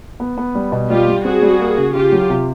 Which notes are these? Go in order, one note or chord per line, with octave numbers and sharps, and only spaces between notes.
B3
B3
G3
B2
G3 F4 G4
G3
C4 F#4 G#4
G3
A#3
C#3
C#3 F4 G4
F#3
C3